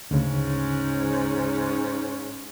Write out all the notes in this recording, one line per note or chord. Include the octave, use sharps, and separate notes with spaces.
D2 G#2 C#3 C#4